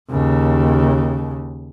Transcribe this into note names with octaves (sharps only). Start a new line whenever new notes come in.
D#2 C#3